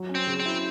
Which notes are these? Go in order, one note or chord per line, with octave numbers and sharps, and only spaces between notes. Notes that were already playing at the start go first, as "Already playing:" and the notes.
Already playing: F#3
C#4
C4
C#3
C4
E4